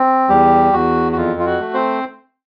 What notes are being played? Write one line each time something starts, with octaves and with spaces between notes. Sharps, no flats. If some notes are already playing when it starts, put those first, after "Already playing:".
Already playing: C4
E2 G3 G4
E2 F#4
F#4
F2 F4
F4
F#4
A3
C4 C5